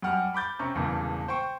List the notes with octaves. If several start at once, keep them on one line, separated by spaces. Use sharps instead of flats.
F#2 G3 G4 F#5 F6
B5 D6 G6 A6
C3 C#4 A#5 C#6
E1 G2 A#2 C#3 E3
C5 G5 C#6